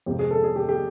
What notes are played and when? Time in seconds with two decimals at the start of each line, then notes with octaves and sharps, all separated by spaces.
0.06 F2 C3 F3 G#3 G4
0.19 G#4
0.31 A4
0.44 G#4
0.56 G4
0.69 G4